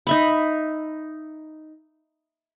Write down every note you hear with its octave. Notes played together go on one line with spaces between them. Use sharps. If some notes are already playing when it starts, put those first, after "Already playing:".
D#4 E5 B5